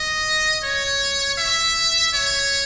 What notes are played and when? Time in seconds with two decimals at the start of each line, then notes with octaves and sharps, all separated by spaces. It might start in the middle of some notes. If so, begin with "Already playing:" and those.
Already playing: D#5
0.63 C#5
1.39 E5
2.15 C#5